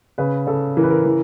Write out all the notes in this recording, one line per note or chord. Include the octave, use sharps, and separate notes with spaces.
C#3 B4
C#3 A4
E3 A#4
B4
A#4
E3